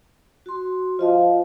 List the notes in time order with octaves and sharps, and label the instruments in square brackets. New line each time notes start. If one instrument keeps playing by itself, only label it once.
[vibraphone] F#4 C6
[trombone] F3 [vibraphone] F4 D#5 F5